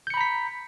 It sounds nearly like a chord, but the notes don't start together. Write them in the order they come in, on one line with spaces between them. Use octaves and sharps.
G6 C#7 B5 A#5 B6